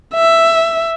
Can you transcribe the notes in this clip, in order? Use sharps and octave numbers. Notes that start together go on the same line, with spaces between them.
E5